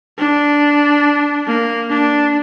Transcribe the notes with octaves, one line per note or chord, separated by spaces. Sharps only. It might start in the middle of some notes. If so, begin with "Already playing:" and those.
D4
A#3
D4